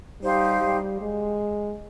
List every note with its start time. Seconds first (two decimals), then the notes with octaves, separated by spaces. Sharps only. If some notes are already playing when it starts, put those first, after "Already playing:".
0.21 G3 D#4 G4 C5 F5
0.62 G3
1.01 G#3